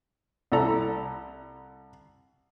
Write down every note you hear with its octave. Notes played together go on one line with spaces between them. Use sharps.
C2 E4 A4 A#5